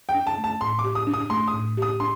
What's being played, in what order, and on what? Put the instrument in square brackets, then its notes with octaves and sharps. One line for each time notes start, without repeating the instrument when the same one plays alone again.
[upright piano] G5
[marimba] D4
[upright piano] A5
[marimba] A3
[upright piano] A5
[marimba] A2 [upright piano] C6
[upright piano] D6
[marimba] G4
[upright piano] D#6
[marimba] D4
[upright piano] D#6
[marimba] A3 [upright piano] C6
[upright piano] D#6
[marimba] A2
[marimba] G4 [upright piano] D#6
[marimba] D4 [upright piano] C6